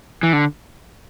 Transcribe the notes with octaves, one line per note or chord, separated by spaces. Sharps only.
E3
D3